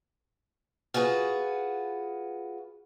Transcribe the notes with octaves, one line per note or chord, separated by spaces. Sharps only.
F4 F#4 G#4 B4